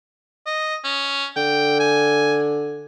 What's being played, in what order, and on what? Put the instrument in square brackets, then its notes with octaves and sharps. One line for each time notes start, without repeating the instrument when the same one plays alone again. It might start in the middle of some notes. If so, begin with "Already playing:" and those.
[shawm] D#5
C#4
[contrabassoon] D3 [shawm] G5
[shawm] G#5